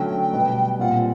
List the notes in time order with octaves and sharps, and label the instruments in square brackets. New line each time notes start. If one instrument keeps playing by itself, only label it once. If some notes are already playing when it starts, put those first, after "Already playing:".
Already playing: [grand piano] D3 F#3 A3 C#4 [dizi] G5
[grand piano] B2 G3 B3
[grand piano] A#2 G3 C4 F4 [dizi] F#5